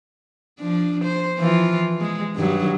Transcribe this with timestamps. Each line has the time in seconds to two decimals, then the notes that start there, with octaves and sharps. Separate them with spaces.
0.60 F3 D4
1.05 C5
1.39 E3 F3 F4
2.01 G#3
2.36 G2 D#3 F#3